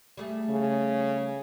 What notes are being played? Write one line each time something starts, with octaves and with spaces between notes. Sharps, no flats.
G3 A3 G#4
C#3